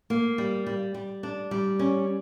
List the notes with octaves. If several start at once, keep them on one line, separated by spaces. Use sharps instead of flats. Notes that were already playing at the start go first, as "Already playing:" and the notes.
A#3
G3
G3
G3
D4
G3
C#4